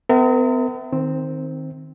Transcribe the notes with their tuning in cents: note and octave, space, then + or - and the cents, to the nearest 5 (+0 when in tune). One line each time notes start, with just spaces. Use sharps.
B3 +45 A#4 -25 E5 -5
D#3 +0 C4 +0